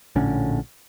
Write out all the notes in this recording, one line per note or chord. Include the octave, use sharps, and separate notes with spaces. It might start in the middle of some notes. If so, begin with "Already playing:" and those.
A#1 A2 D3 C#4